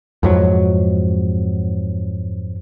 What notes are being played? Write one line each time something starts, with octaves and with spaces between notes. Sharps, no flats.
F2 G#2 F#3